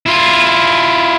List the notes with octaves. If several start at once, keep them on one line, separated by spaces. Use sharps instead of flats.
E4 F4